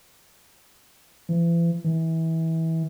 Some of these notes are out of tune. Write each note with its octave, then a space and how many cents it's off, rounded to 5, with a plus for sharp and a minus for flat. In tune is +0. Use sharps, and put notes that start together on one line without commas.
E3 +40
E3 -25